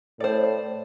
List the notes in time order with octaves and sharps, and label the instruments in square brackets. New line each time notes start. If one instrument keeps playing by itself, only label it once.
[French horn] A2 [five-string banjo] C5 D5